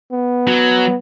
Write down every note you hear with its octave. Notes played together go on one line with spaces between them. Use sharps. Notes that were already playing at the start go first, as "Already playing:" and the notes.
B3
F#3